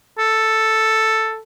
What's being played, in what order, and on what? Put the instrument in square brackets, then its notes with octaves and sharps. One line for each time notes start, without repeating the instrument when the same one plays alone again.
[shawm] A4